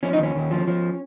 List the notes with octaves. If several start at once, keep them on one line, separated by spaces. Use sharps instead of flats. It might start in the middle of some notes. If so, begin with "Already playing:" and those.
F3 C#4
D#4
D#2 C#4
D#2
F3
F3